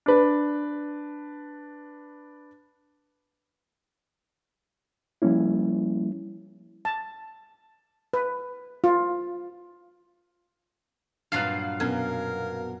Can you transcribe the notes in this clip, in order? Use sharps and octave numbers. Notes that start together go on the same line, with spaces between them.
D4 B4
F3 G3 A#3 C#4 E4
A5
B4
F4
G2 A#2 F#3 F5 F#6 A6 C7
F#2 B2 A#4 G#6